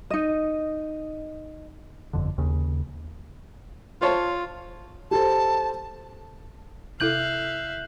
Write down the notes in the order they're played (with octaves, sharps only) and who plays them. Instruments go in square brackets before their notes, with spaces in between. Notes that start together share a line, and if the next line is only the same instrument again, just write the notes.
[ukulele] D#4 D#5
[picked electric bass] G1 F2 D3
D#2 C#3
[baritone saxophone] F4 [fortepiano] C5 C#5 A5
[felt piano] G4 A4 C5 [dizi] A5
[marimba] C3 E4 A4 [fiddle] E5 F5 [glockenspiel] F#6 G6 F#7